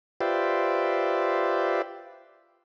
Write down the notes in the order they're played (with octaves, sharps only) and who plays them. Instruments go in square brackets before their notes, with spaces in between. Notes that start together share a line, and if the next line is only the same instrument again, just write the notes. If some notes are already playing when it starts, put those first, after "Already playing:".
[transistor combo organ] F4 G4 B4 C5 D5 E5